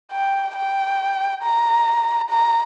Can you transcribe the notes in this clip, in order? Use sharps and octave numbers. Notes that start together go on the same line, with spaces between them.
G5
G5
A#5
A#5